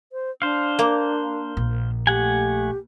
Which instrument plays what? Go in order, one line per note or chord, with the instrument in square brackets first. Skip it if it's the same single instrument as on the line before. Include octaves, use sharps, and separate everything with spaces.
[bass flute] C5
[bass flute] D4 [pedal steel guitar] C5 F5
[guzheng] A#3
[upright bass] A#1
[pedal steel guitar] A3 F#5 G#5 [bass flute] G4